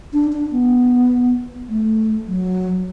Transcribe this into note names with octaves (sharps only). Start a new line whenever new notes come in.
D4
D4
B3
A3
F#3